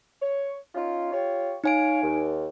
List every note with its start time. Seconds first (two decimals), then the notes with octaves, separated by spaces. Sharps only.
0.20 C#5
0.75 C#4 D#4 F4
1.11 F4 G4 C#5
1.64 D#4 C#5 F5 G#5 D7
2.01 D#2